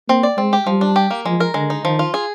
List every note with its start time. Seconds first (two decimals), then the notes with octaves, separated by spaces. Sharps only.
0.09 A#3 C4
0.23 D5
0.37 G#3 C4
0.53 G4
0.67 F3 G3
0.81 D4
0.96 G4
1.11 A#3
1.26 F3 G#3
1.40 A#4
1.54 D3 G#3
1.70 D#4
1.84 D#3 F3
1.99 F4
2.14 G#4